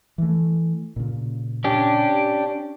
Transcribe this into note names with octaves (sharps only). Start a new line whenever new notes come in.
E3 A3
A#2 C#3
C#4 D4 G4